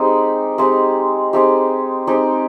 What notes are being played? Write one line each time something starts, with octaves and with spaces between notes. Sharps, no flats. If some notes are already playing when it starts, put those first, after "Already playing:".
Already playing: G#3 C4 D#4 G4
G#3 C4 D#4 G4
G#3 C4 D#4 G4
G#3 C4 D#4 G4